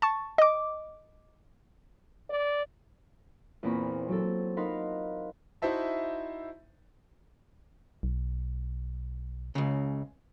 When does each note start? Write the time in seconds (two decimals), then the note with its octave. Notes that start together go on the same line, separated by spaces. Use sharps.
0.02 A5 C#6
0.38 D#5 D6
2.30 D5
3.63 E2 A#2 C4 A#5 B5 C#6
4.09 F#3 C4 A4
4.57 D#4 A#4 F5 F#5 B5 C6
5.62 D#4 E4 F#4 C5 E5 A5
8.03 B1
9.55 C#2 C#3